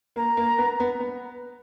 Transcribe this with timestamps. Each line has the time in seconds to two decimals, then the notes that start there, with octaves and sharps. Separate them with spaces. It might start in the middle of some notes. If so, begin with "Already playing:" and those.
0.16 A#3 A#5
0.37 A#3
0.58 B3
0.80 B3
1.00 B3